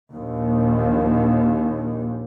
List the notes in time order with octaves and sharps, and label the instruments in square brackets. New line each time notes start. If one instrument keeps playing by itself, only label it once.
[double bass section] A#1 D#2